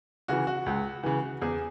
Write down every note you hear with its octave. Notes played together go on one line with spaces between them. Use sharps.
C#3 E3 F#4
F#4
C#2
C#3 E3
E2 G#4